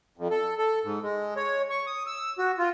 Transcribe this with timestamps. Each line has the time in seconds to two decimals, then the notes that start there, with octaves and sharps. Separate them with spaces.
0.18 F2
0.31 A4
0.58 A4
0.84 G#2
1.02 G#3
1.36 C#5
1.70 C#6
1.87 D#6
2.07 E6
2.39 F#4
2.59 F4